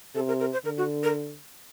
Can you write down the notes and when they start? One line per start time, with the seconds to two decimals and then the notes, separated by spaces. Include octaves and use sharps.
0.15 C3 A4
0.28 A#4
0.40 A#4
0.53 C5
0.65 D3 A#4
0.78 F#4
1.03 A#4